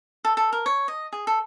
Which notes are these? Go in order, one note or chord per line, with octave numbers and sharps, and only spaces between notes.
A4
A4
A#4
C#5
D#5
G#4
A4